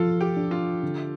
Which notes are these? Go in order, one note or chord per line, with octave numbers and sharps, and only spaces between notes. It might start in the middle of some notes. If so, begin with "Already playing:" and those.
Already playing: F3 F4 A4
G4
D4
F4
D3